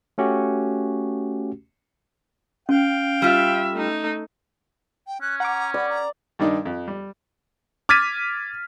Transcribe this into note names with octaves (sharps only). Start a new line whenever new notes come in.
A3 C#4 F#4 G4
C#4 F5 G5
G3 F4 E5
A3 D#4
G5
C#4 F#6
F#5 A#5 D6
D5 B5
A#5
G2 D#3 G3 D4 D#4
F2
G3
D6 F6 G#6 A6 B6 D#7